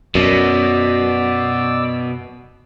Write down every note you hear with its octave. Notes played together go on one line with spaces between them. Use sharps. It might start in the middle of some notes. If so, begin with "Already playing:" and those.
F#2 B2 D5 E6